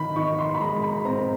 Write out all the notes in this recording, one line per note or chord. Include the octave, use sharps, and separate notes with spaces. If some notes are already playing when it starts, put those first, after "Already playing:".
Already playing: D#3 B5
D#4 C#6
C6
B5
G#3 A#5
B5
C4 A#5